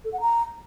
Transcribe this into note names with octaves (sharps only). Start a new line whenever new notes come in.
A4
F#5
A#5